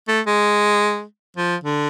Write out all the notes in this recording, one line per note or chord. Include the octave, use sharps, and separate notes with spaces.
A3
G#3
F3
D3